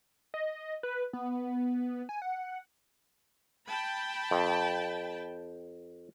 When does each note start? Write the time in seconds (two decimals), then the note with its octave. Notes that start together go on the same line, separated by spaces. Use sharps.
0.34 D#5
0.83 B4
1.13 B3
2.09 G#5
2.22 F#5
3.68 G5 A5 B5
4.31 F2